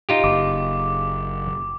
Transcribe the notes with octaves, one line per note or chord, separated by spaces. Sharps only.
D#4 F4 G4
F#1 D6